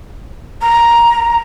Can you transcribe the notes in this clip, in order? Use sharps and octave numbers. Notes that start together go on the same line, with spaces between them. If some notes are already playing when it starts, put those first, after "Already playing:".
A#5